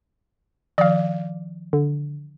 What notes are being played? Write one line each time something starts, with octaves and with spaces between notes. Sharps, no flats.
D#3 F3 D5 F5
D3